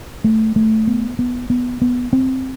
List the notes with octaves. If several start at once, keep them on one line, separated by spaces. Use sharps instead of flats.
A3
A3
B3
B3
B3
B3
C4